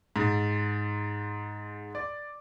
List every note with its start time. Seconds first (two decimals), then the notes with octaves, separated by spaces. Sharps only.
0.16 G#2
1.95 D5